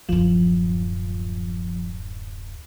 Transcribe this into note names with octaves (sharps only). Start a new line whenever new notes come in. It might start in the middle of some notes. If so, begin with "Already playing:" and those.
D1 F#2 F3